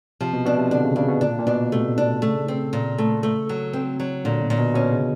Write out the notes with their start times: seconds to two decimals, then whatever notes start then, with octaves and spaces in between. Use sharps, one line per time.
0.21 C3 F3
0.33 B2
0.46 B2 D4
0.58 C3
0.71 D3 D4
0.84 C#3
0.96 C#3 D4
1.09 B2
1.21 A#2 D4
1.39 A#2
1.47 B2 D4
1.72 C3 A3
1.98 D4
2.22 C#3 A3
2.48 C4
2.73 A#2
2.98 A3
3.23 A3
3.49 F#3
3.73 C4
4.00 F#3
4.24 A#2 D3
4.41 B2
4.50 A#2
4.58 B2
4.75 B2 C#4
4.92 C#3